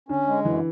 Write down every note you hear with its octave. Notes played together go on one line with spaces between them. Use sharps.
D3 C#4
G#3
F#2 E3